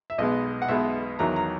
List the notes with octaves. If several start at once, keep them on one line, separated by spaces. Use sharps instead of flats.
E5
B1 B2 G#3 B3 D#5
F#5
B1 B2 G#3 B3 E5
E2 D#3 F#3 A#5
A#5